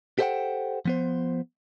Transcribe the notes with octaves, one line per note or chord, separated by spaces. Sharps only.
G4 A4 C5 E5 F#5 G5
F3 B3 C5